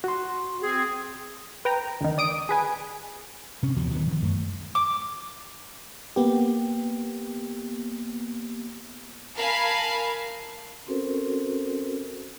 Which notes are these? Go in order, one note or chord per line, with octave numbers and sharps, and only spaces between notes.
F#4 C6
C4 G#4
B4 G5 A#5
D2 D#3
D5 D#6 D7
G#4 B4 G#5
C3 C#4
D#2 B2 F3 F#3
D1 D#3 F#3 B3
D#3 F3
F#2 A3
D6
A#3 B3 G4
A#4 F5 G#5 A5 B5 C7
C4 C#4 F#4 A4 A#4 C5